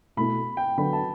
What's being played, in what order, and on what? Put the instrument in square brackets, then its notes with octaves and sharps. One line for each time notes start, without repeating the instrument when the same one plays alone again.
[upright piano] B2 A3 E4 A4 [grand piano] B5
[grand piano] G5
[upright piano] D3 F#3 B3 D4 A4 [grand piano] B5
[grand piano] A5